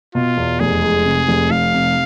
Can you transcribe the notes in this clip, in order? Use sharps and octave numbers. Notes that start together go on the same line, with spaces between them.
B2 F4
E2
F1 G#4
G#3
C3
F1
F1 F5
C3